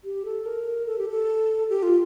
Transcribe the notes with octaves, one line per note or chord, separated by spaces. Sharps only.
G4
A4
A#4
A4
G4
A4
G4
F4